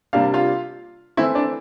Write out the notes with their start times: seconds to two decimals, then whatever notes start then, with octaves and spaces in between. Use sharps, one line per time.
0.13 C3 G3 A#3 D4 F5
0.34 F4 F5
1.17 E3 A3 C4 E4 E5
1.35 D4 D5